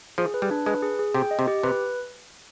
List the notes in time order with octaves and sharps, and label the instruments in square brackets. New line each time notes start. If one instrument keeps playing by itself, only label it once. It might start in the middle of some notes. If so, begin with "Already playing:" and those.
[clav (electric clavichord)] F3 [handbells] G#4
[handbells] B4
[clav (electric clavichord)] G3
[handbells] D4
[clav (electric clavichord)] G#3 [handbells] B4
[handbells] G#4
G#4
[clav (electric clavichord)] C3 [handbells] G5
[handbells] D#5
[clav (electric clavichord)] C3
[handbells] G4
[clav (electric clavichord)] C3 [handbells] B4